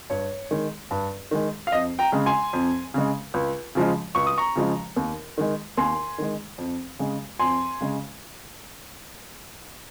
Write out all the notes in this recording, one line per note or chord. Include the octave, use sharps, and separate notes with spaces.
G2 C#5
D#3 G#3
G2
D#3 G#3
F5
F2 D#5
G5 A#5
C#3 G#3
G#5 C6
F2
C#3 G#3
C#2
C#3 F3 G#3
C#2 C#6
D#6
A#5 C#6
C#3 F3 G#3
D#2
D#3 G#3
D#2 G#5 C6
D#3 G#3
F2
C#3 G#3
F2 G#5 C6
C#3 G#3